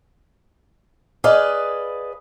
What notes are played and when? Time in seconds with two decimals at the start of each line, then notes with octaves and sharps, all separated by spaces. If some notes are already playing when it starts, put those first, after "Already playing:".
1.24 G#4 B4 D5 D#5 F5